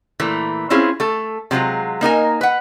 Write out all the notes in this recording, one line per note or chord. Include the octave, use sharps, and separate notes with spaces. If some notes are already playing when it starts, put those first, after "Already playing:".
A#2 E3 A3
C4 C#4 E4 F4 G#4
A3 A4
C3 F#3 G#3 F4
A#3 D#4 A#4 G#5
B4 F#5